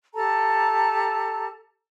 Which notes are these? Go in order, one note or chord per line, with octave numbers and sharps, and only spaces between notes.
G4 A4 A5 A#5